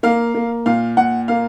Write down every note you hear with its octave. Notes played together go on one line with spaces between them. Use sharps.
A#3 F5
A#3
A#2 F5
A#2 F#5
A#3 F5